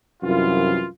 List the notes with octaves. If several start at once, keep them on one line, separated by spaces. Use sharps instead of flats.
C2 F#2 E3 F4